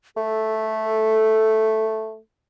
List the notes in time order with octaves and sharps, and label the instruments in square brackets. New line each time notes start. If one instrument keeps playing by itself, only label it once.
[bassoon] A3 [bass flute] A4